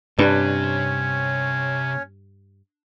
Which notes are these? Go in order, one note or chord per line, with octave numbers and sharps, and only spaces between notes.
G2 C3 C#4 D4 B4 C#5